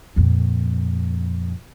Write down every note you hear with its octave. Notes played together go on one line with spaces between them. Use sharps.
F2 A#2